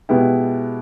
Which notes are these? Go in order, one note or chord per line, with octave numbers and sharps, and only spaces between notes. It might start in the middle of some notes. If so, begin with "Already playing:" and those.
B2 G#3 B3 E4 G4